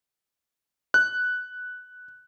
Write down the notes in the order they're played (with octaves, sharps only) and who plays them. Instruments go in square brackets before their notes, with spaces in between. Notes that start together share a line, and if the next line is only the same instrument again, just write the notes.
[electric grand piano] F#6